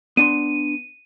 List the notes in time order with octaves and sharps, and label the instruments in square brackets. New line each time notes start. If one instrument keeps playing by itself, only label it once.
[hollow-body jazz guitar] B3 D4 C6 [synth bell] D#7